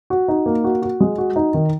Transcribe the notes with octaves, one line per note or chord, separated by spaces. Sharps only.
F#4
D#4
A#3
F#4
F#4
G#3
F#4
D#4
D#3